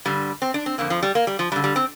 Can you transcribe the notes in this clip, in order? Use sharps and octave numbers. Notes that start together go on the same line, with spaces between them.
G2 D3 G3
C4
D4
C4
F2 D3 A#3
F3
G3
A#3
G3
F3
G2 D3 G3
G3
C4